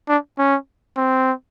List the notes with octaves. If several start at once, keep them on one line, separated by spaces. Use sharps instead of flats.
D4
C#4
C4